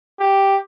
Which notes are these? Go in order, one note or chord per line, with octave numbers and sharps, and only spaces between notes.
G4